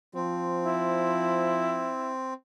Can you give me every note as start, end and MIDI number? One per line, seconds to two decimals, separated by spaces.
0.15 1.93 53
0.15 2.34 60
0.63 2.12 64